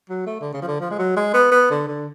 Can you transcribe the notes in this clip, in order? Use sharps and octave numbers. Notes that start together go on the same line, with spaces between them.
F#3
A3
D3
C#3
F3
D3
F3
G#3
F#3
G#3
B3
B3
D3
D3